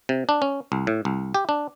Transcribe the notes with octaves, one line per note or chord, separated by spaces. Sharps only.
C3
D4
C#4
C2
A2
C2
G4
D4